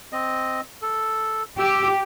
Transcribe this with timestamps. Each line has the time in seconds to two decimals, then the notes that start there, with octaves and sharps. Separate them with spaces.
0.13 C4 D#5
0.82 A4
1.59 G4 E6